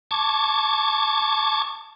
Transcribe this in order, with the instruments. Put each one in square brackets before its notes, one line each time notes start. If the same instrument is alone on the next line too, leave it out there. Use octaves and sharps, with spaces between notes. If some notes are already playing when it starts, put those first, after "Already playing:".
[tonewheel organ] A5 C#6 D6 G#6